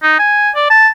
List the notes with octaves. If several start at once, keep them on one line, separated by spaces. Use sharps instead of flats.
D#4
G#5
D5
A5